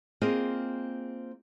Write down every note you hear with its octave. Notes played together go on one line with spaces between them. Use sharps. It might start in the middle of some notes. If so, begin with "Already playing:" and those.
A#3 C4 F4 G#4 D#5